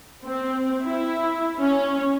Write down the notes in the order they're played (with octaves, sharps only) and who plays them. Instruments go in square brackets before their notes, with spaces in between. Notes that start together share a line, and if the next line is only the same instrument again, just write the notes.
[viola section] C4
E4
C#4